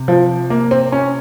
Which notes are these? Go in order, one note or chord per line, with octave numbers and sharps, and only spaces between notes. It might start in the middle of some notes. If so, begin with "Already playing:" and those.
Already playing: C3
F3
A#3
C4
C#4